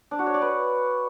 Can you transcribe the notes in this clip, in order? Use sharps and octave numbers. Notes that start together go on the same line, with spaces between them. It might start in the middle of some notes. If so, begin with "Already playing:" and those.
D4
F#4
C#5
D5
B4